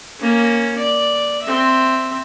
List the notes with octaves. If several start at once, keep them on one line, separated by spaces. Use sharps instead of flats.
A#3 C#4
D5
C4 E5